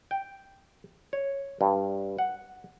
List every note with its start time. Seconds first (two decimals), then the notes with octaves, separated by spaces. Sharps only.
0.11 G5
1.13 C#5
1.61 G2
2.19 F#5